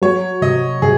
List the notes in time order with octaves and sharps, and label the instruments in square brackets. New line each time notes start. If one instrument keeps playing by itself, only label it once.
[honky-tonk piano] F#3 [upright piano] C#5
[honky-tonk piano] C3 [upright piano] D#5
[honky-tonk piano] C3 [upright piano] G#4